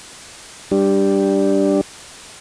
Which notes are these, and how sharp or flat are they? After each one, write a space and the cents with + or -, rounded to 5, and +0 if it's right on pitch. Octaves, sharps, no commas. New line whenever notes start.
G3 +0 D4 +0 G4 +0